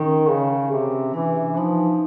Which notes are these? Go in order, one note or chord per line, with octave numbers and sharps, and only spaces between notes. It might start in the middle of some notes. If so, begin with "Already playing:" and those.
Already playing: D#3 C#4
C#3
C3
E3 D4
F3 D#4